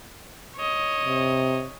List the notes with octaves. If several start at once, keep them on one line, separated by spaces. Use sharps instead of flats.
C#5 D#5
C3